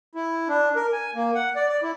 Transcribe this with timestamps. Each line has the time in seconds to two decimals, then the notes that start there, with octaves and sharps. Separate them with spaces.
0.15 E4
0.48 D4
0.76 A#4
0.92 G#5
1.15 A#3
1.35 F#5
1.56 D5
1.68 D5
1.83 E4